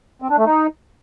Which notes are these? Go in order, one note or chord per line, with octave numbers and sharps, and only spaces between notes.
C4
D4
A3
D#4